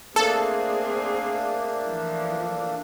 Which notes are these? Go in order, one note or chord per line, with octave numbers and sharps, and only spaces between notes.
A3 A#3 C4 D4 G#4 A4
E3 F3